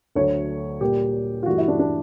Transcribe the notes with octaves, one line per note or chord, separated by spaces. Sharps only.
D2 D3 F#3 A3 C#5
A#2 G3 G4
F4
G2 E3 A3 F#4
E4
D4
D4